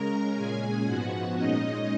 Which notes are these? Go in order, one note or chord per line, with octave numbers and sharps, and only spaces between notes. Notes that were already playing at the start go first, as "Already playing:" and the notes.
Already playing: C#3 G#3 C#4 A#4 A#5
A#2 G#3 C#4 G#4 G#5
G#2 F3 B3 F#4 F#5
A#2 G#3 C#4 D#4 D#5